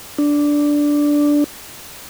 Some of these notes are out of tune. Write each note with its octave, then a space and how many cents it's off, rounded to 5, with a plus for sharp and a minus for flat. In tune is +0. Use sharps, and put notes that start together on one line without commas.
D4 -5